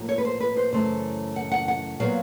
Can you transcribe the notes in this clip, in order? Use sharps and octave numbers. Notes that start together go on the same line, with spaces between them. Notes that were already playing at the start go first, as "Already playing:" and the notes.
Already playing: A2 F3 A#3
C#5
B4
C5
B4
C5
F#2 C#3 E3 A3 C5
F#5
F#5
F#5
A#2 F#3 B3 F5